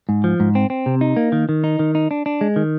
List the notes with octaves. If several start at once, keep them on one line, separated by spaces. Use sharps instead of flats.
G#2
F3
G#2
C4
C4
C3
D#4
A#3
D#3
D#3
D#4
D#3
D#4
D4
D4
G#3
D#3